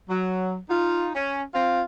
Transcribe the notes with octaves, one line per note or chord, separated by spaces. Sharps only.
F#3
D#4 F4
C#4
C4 F4